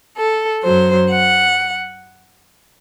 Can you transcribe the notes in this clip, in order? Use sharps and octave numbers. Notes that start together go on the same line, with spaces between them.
A4
F#2 F#3 C5
F#5